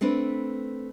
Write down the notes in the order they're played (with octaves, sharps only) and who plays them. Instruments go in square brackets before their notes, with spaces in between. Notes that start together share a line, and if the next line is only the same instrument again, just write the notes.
[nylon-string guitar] A3 C4 D4 B4